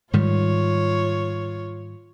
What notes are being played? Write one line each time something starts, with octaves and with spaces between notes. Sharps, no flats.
G#2 D#3 G3 F4 C#5